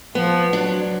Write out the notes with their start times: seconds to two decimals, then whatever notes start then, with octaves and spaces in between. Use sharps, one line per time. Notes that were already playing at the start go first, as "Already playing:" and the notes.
0.15 F3 B3
0.53 F#3 D4